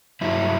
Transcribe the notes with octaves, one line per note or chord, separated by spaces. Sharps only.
G2 F#3 E4